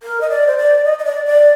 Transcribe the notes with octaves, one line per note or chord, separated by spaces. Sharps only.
A#4
D#5
D5
C5
D5
D#5
D#5
D5
D5